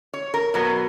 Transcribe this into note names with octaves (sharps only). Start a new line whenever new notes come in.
C#5
A#4
B2 F#3 B3